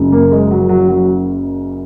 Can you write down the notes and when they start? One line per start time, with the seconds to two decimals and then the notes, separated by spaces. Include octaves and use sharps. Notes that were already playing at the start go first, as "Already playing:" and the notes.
Already playing: F#1 F#2 C#3
0.12 A#3
0.31 G#3
0.51 F#3
0.69 F#3
0.89 F#3